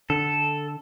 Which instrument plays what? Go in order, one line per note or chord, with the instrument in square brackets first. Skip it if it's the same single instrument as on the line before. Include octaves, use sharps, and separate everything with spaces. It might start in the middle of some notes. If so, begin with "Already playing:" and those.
[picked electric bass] D3 [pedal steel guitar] A4